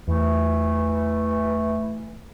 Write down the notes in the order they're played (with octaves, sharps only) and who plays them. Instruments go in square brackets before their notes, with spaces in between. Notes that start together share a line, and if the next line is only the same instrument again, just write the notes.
[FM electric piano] E2 [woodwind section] E3 A3